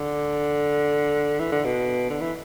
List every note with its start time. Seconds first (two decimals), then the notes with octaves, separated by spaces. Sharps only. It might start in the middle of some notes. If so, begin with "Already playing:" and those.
Already playing: D3
1.39 E3
1.52 D3
1.64 B2
2.10 D3
2.21 E3